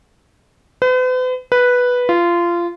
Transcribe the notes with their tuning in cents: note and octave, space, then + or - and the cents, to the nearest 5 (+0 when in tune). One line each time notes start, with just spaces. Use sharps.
B4 +45
B4 -5
F4 -20